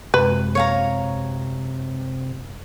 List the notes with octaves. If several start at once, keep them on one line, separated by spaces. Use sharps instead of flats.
F#2 C3 G#3 B4
C#5 F5 A#5